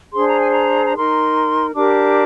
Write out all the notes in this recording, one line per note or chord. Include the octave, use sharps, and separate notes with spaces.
D4 G#4 C5 C6
A#5
G#5
A#5
A#5
D#4 A#4 C6
D4 G4 A#4 D6